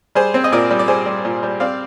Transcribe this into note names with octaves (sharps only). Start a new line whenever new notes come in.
G3 G#4 C5
C4
D#5
A#2 A#4 D5
G3
D5
G3 G#4 C5
G3
A#2
G3
C4 D5 F5